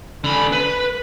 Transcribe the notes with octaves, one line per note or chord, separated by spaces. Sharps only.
D3 B5
B4